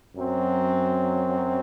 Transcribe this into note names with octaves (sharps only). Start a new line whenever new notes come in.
F#2 F#3 C4